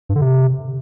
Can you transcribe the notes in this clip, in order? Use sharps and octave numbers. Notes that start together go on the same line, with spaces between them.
G2
D3
C3